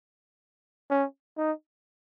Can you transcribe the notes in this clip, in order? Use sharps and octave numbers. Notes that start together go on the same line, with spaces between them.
C#4
D#4